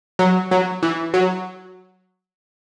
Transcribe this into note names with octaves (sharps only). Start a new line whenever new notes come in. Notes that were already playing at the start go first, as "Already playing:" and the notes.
F#3
F#3
E3
F#3